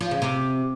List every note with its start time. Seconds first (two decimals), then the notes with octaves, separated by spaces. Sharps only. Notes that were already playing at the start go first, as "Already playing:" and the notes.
0.01 F3
0.11 C#3
0.22 C3